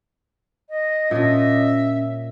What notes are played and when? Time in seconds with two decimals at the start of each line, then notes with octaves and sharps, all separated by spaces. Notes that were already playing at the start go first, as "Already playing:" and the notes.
0.69 D#5
1.11 A#2 C#4 D4 E5